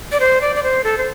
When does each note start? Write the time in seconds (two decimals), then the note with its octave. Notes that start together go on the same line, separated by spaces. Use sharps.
0.12 D5
0.20 C5
0.41 D5
0.56 D5
0.63 C5
0.84 A4
0.98 C5